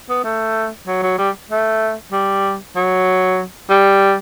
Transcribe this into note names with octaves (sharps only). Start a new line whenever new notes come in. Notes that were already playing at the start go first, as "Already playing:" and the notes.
B3
A3
F#3
F#3
G3
A3
G3
F#3
G3